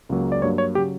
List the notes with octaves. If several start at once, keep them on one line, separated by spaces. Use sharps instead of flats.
C#2 C#3 F#3 A#3
D5
G2 F#3 A#3 C#5
C#5
C#3 F#3 G4